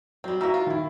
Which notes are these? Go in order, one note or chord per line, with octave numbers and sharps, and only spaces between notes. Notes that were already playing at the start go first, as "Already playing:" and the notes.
F#3 G3 C4
E3 A#3 F#4 A#5 E6
F4
D#3 E4